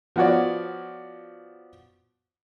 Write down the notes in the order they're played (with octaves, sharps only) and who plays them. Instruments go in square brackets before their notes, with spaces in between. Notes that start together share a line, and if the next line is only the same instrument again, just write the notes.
[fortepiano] F3 B3 F#4 C#5 D5